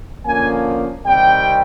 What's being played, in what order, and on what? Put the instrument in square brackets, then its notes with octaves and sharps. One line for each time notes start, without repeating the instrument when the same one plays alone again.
[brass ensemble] D3 F3 A#3 C#4 G#5
C3 D#3 G3 C4 G5